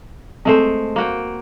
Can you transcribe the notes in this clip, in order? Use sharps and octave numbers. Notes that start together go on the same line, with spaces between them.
G#3 A3 C4 A4 C5
A#3 F#4 G5